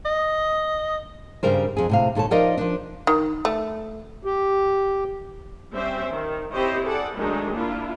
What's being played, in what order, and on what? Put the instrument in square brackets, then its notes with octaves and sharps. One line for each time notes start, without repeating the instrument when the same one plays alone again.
[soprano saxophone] D#5
[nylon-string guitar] G2 C#3 G3 A#4 C5
F2 G#4
A2 C3 F5
D#2 A#2 A4 C#5 A5
F3 D#4 A#4 D5 D#5 F5
F3 D4
[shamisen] D#3
A3
[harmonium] G4
[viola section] G3 C4 C#4 G4 C5 E5
D#3
C4 E4 G4 C5 C#5 D#5
G#4 A4 D5 F#5
D#3 F#3 G#3 A3 D4 D#4
A#3 D4 E4 F4